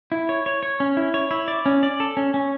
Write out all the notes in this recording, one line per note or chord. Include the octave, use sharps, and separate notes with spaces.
E4
C#5
C#5
C#5
C#4
E4
C#5
E4
D5
C#4
D5
A4
C#4
C#4